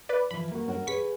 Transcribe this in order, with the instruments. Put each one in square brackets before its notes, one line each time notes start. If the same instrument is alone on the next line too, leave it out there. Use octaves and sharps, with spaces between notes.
[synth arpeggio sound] B4 D5
[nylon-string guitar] E3 F3 [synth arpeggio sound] B5
[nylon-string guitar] A#3 F#4
C#4 F#4 A#4
[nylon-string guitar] G#4 B4 [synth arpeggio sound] C#6 B6